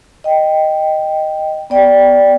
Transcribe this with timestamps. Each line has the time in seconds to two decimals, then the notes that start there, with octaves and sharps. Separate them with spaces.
0.24 D#5 G5
1.70 B3 D5 G5